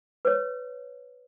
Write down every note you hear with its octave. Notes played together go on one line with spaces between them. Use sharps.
B4 C#5